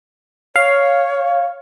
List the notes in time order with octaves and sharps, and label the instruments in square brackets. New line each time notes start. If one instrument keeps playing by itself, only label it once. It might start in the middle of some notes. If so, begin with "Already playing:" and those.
[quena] C#5 [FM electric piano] F5